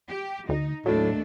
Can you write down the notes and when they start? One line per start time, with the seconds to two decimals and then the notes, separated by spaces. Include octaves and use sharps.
0.11 G4
0.49 D2 D#4
0.86 D#2 A2 F#3 A3 D4